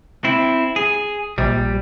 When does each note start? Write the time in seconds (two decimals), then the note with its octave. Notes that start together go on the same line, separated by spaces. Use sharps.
0.24 C4 E4
0.76 G#4
1.38 A#1 G3